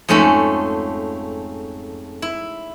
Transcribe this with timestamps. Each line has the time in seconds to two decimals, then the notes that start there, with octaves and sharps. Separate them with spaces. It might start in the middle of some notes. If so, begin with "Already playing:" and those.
0.09 F2 G#2 A3 C#4 A5 B5
2.22 E4